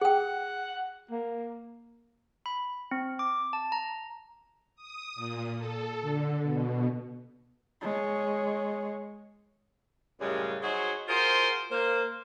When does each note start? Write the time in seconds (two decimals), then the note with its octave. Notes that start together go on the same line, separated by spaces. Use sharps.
0.01 G#4 F#5 G5
1.11 A#3
2.46 B5
2.91 C4
3.19 D6
3.53 A5
3.72 A#5
4.76 D#6
5.15 A#2
5.58 A4
6.01 D3
6.42 B2
7.82 G#3 C#5
10.20 F#2 A2 C#3 G3 G#3
10.62 F#3 D#4 F#4 G#4 C5 C#5
11.08 F4 F#4 G#4 A#4 C5
11.71 A#3 C5